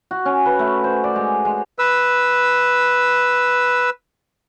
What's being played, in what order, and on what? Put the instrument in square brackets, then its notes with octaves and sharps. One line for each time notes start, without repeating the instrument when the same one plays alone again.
[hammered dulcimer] F#4
C#4
B4
A3
C5
D5
G#3
G#3
[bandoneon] B4 E6